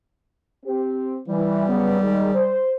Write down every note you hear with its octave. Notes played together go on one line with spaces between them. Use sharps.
C4 G4
E3 G3
C#3 F#3 B3
D#3 G#3
C5